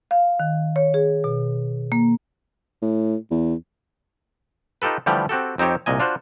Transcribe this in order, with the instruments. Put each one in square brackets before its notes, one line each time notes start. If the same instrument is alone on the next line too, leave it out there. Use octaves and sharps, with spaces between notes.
[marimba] F5
D#3
C#5
G#4
B2
A#3
[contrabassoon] A2
E2
[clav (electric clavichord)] D#4 F4 G4 A4 B4
D3 E3 F3 G3 A3 G4
C4 F#4 G4 A4
F2 C4 D#4 G4 C#5
C2 A#2 D#5 G#5
D4 F4 F#4 C5